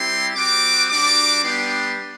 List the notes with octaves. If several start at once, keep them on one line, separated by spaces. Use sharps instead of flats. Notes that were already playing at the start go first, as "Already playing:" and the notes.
Already playing: G3 C4 E4 G4 C6
G3 C4 F#4 D6
G3 D4 F#4 D6
G3 B3 D4 G4 C6